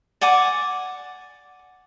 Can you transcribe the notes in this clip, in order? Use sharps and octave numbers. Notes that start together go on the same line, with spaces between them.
D5 F#5 G#5 D6